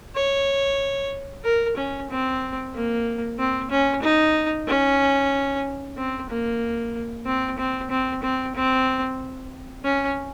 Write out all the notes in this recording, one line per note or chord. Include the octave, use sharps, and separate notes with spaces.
C#5
A#4
C#4
C4
A#3
C4
C#4
D#4
C#4
C4
A#3
C4
C4
C4
C4
C4
C#4